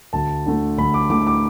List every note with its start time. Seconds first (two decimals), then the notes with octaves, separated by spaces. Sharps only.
0.13 D2 A5
0.46 D3 A3
0.78 D2 B5
0.94 D6
1.10 D3 A3 D6
1.27 D6